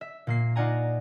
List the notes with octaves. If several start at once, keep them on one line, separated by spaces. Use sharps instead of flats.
E5
A#2 A#3 C7
D#4 F4 D5 F#5 G#5 A#5